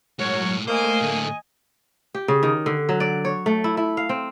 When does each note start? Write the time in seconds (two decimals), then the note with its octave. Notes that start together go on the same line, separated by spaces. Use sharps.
0.19 A2 F#3 G#3 F#4 A#4 C#5
0.68 A3 A#3 C5 D#5 G#5
1.01 A2 D3
2.15 G4
2.28 C#3
2.43 D#3
2.66 D3
2.89 F#3
3.00 D5
3.25 C#5
3.46 A3
3.64 E4
3.77 E4
3.97 F5
4.09 C4